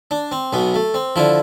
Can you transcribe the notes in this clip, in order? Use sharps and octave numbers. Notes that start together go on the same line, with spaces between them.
D4
C4
B1 B2 B3
A3
C4
D3 F3 E4